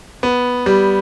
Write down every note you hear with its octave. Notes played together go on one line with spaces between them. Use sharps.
B3
G3